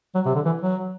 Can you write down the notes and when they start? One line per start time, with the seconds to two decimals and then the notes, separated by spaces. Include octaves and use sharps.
0.15 F#3
0.25 C3
0.35 D3
0.45 E3
0.62 F#3